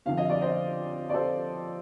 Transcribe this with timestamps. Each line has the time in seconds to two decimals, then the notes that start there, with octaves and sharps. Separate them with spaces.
0.06 F2 D3 F3 F5
0.17 D#5
0.30 D5
0.41 C5 D#5
1.09 D5
1.14 A4 C5